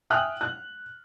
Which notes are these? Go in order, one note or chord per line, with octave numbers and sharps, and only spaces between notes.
E5 G5 G#5 D#6 F6 F#6
F#6